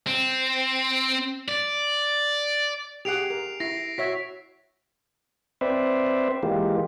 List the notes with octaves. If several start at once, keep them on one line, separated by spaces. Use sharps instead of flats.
C4
D5
G4 G#4 F#5 C7 D7 F7
A#4
E4 A#6 C7
F#4 C#5 E5 B6
C4 B4 C5 D5 E5
E3 G#3 A#3 F4 G4